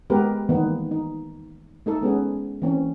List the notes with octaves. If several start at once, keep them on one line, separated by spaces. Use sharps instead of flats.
G#3 B3 G4 A#4 B4
D#3 E3 G3 A#3 B3 D#4
D#4
A3 D#4 A4
G#3 B3 C#4 G#4
E3 A#3 C4 C#4